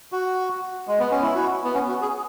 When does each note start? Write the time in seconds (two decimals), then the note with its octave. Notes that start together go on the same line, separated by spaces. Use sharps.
0.12 F#4
0.87 G#3
0.99 B3
1.11 C#4
1.22 E4
1.35 F#4
1.64 B3
1.74 C#4
1.88 F#4
2.02 G#4